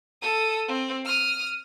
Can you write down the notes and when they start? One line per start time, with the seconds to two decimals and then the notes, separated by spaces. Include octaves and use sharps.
0.22 A4 D#6
0.68 C4
1.06 D#6 F6